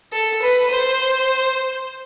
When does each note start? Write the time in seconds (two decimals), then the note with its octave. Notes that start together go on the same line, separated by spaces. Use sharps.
0.13 A4
0.42 B4
0.71 C5